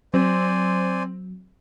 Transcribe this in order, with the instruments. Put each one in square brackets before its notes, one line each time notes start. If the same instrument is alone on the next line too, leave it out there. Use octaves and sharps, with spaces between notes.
[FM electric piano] F#3 [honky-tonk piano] C4 [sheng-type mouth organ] C5 D5 G#5